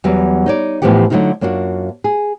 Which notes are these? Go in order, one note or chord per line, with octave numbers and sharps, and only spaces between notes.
E2 F#3 G3
D#4 C#5 D5
A2 E3 F3 B3 G4 F#5
D3 F#3 G#3 A3 D#4 F4
F#2 A#3 D4 F4 F#4
G#4